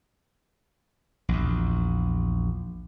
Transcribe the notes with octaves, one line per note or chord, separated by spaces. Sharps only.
A#1 E2